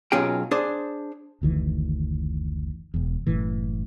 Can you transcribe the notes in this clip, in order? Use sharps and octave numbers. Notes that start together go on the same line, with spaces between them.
B1 F#3 C#4 F4 G#4 G5
D4 G#4 C5
F#1 D2 D#3 E3
E1 E2
F#1 F#2 A2 E3